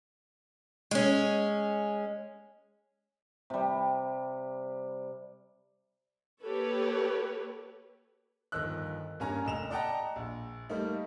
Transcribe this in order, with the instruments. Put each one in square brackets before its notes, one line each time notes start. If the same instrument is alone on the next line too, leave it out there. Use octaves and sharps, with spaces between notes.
[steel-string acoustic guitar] G#3 C#4
[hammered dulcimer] C3 G3
[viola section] A#3 G4 A4 B4 C#5
[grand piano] G1 D#3 F3 D#5 E6 F#6
G2 A#3 C#4 G#5 A#5
F1 D#5 E7 F7
D5 D#5 F#5 G5 A5 A#5
A#1
G3 A3 A#3 D#4